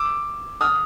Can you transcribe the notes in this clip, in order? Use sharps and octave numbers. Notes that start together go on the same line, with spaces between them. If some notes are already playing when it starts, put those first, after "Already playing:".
Already playing: D6 E6
D#6 F6